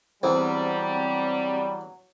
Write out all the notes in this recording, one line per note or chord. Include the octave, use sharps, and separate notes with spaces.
E2 F#3 G3 C4